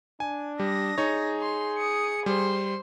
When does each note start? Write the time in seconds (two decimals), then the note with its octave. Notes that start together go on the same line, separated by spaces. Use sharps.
0.20 D4 G#5
0.60 G3 D#6 A#6
0.98 D#4 G#4 C#5
1.41 C6
1.78 D#6 C#7
2.26 G3 C5 C6